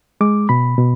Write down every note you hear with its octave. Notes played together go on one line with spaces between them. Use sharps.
G#3 D6
B2 B5
B2